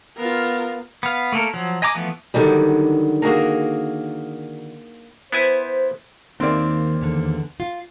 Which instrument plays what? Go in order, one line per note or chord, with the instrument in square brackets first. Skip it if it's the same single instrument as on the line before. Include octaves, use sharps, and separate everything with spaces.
[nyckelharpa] B3 F5 [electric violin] F4 A#4
[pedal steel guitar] B3 F5
A3 A#3 A4 A#4
F3 F#3
D#5 G#5 A#5 D6
E3 F3 A3 B3
[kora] D3 D#3 F#3 G3
A#3 F#4 G#4 A#4
[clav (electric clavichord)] B3 E4 G#5 [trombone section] C5
[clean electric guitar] D#2 A#3 [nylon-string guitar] D#3 [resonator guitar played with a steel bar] C4 D5
[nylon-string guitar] E2 D3
F4